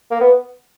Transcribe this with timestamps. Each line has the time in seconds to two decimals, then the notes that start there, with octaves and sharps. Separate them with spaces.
0.11 A#3
0.21 B3